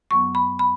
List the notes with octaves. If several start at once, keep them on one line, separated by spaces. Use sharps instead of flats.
F#2 F#3 B3 C#6
B5
B5